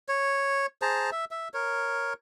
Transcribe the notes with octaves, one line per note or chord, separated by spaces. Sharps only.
C#5
G#4 C5 A5 A#5
E5
E5
A#4 C#5